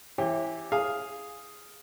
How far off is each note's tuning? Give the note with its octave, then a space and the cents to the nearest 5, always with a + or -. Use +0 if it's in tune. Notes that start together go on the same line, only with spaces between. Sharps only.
E3 +0 G4 +0 C#5 -45
G#4 +0 F5 +0 G#5 +0